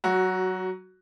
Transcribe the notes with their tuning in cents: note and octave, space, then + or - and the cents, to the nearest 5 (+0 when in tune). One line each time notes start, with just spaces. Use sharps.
F#3 +20 F#4 +0